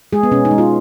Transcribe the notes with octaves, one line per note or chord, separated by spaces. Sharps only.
G#3 G#4
B3
B2 C#4
D#4
G#3
F4